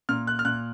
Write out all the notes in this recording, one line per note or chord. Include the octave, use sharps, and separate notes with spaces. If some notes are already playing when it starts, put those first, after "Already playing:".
A#2 F6
F#6
F6
A#2 F#6